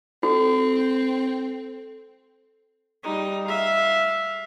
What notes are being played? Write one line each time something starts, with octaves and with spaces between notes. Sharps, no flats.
C4 F#4 A4
G3 D#4
E5 F5